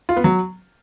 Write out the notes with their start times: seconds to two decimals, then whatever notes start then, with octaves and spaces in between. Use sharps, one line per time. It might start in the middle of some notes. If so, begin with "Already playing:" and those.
0.09 F4
0.16 B3
0.24 F#3